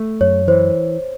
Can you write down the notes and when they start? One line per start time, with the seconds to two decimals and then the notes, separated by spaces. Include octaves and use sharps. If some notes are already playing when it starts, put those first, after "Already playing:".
Already playing: A3
0.21 F#2 C#5
0.48 E3 C5